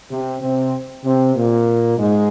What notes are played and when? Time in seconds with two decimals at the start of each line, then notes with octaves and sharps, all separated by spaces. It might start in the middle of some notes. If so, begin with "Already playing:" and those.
0.10 C3 C4
0.42 C3 C4
1.04 C3 C4
1.36 A#2 A#3
1.98 G#2 G#3